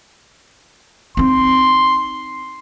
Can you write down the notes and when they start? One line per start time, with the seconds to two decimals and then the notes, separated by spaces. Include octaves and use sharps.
1.17 C4 D#4 C6